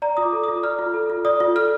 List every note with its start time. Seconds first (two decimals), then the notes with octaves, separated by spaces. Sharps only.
0.02 D5 A#5
0.17 F4 D#6
0.23 D6
0.32 A4
0.44 F4 D#6
0.63 D5 F6
0.79 F4
0.94 A4
1.10 F4
1.25 D5 D#6
1.40 F4
1.55 A4 F6